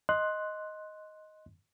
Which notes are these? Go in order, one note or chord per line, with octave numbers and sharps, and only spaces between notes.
D#5 C6 F#6